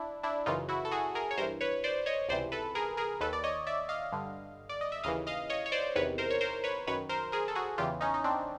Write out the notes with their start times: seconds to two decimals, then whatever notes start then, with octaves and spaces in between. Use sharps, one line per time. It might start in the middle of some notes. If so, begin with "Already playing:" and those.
Already playing: D4 E4
0.23 D4 E4
0.46 F#2 C#3 E3 D#4 F4
0.69 E4 F#4
0.85 A4
0.91 F#4 G#4
1.15 G#4 A#4
1.31 C#5
1.37 G2 A#4 C5
1.42 E3
1.61 B4 C#5
1.84 C5 D5
2.06 C#5 D#5
2.29 C#2 C3 E3 C5 D5
2.52 A4 B4
2.75 G#4 A#4
2.97 G#4 A#4
3.21 D#2 D#3 A4 B4
3.33 D5
3.44 C#5 D#5
3.67 D5 E5
3.89 D#5 F5
4.12 G2 D3
4.69 D5
4.81 D#5
4.92 E5
5.04 D#2 C#3 E3 D#5 F5
5.27 D#5 F5
5.50 C#5 D#5
5.66 C#5
5.72 C5 D5
5.96 E2 C3 D#3 B4 C#5
6.18 A#4 C5
6.30 C#5
6.41 A#4 C5
6.64 B4 C#5
6.87 F#2 D#3 B4 C#5
7.09 A#4 C5
7.32 G#4 A#4
7.48 A4
7.55 F#4 G#4
7.78 E2 C#3 E3 F4 G4
8.01 C#4 D#4
8.14 D#4
8.24 C4 D4